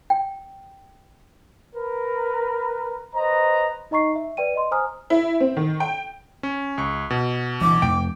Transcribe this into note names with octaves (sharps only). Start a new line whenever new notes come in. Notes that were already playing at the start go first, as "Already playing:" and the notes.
G5
A#4 B4
B4 C5 D#5 A#5
D#4 D#5 A#5 C#6 C7
E5
B4 D5 G5 D#7
D#5 C6
C5 G#5 A#5 D#6 F6
E4
C4
D#3
G5
C#4
C#2 C#6
B2
E3 G3 D4 D6
F2 A3 G5 D7